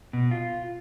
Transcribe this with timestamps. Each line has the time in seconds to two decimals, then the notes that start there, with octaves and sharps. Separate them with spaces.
0.13 B2
0.31 F4